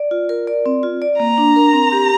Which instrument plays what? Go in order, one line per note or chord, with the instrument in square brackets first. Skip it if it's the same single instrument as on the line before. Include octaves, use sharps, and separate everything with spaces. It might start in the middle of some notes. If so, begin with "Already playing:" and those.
Already playing: [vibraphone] D5
F4
A#4
D5
C4
F4
D5
[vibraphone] A#3 [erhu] A#5
[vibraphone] D4
A#4
C4
G4